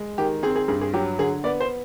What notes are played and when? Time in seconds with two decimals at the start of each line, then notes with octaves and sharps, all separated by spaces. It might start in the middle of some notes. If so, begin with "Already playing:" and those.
Already playing: G#3
0.18 D#3 G4
0.43 C4 G#4
0.56 G#4
0.68 G2 G#4
0.82 G#4
0.94 F#3 G4
1.19 D3 G#4
1.44 B3 D5
1.60 C5